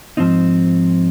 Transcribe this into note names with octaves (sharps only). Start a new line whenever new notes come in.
G#2 F3 C4 D#4